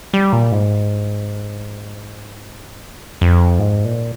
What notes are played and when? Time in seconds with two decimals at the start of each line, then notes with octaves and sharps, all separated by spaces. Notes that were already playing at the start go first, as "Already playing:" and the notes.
0.13 G3
0.33 A#2
0.52 G#2
2.83 G2
3.21 F2
3.59 G#2
3.85 A#2